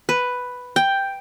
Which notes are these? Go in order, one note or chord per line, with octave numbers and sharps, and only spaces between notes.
B4
G5